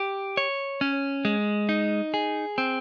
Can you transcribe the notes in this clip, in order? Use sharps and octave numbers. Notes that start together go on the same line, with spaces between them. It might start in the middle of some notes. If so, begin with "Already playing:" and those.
Already playing: G4
C#5
C#4
G#3
D#4
G#4
C4